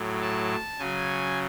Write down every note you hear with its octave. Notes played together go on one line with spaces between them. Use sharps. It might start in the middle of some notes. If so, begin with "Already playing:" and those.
Already playing: A2 F#3
A5
C#3 F#3 G#5